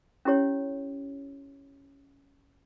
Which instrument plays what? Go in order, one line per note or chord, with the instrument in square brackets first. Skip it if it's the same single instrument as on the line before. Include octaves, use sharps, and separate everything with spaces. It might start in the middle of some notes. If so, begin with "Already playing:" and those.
[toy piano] C#4 E4 G4 C#5